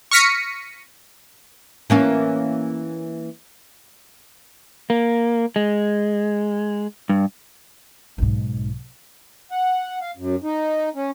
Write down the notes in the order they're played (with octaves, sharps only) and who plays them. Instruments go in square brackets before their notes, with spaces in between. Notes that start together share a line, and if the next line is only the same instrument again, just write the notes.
[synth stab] C#6 F6 A#6 B6 C#7 D#7
[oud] E3 A#3 C#4
[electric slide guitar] A#3
G#3
G2
[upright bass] B1 G#2
[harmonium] F#5
F5
F#2
D#4
C#4